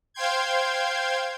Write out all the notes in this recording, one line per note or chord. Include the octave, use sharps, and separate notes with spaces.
C5 F5 G5 C6 G6 G#6